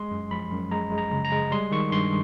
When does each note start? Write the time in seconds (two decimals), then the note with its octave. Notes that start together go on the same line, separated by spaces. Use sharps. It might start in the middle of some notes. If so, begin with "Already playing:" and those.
Already playing: G#3 C6
0.11 F#2
0.31 F3 B5
0.52 F#2
0.71 G#3 A#5
0.92 G#3
0.98 A#5
1.12 C#3
1.25 A#5
1.32 G#3
1.51 G3 C6
1.71 D#3 C#6
1.92 G2 C6